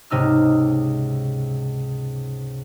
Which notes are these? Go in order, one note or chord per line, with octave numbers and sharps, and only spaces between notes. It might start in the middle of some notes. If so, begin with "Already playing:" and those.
C#2 G#2 C3 D#4 E6 F6